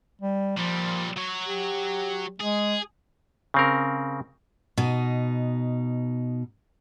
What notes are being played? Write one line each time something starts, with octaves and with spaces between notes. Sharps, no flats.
G3
A#2 F3 G3
F#3 C#5
G4
G#3 G#4
C#3 C4 A#4
B2 D#4